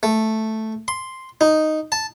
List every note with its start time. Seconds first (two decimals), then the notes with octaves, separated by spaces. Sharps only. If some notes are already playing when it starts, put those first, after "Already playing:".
0.03 A3
0.88 C6
1.41 D#4
1.92 A5